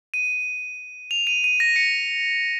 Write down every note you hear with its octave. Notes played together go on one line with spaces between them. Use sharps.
D#7
F7
D#7
D#7
A#6
C#7